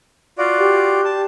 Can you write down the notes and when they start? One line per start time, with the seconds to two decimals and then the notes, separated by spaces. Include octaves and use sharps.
0.38 F4 F#4 D5
0.58 G4
1.05 A5